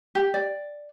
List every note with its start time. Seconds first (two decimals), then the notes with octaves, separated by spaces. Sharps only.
0.15 G4
0.34 D5